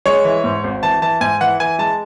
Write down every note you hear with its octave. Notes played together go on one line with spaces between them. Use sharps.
G#3 C#5
E3
G#2
G#1
E3 A5
E3 A5
G#2 G#5
E3 F#5
E3 G#5
G#3 A5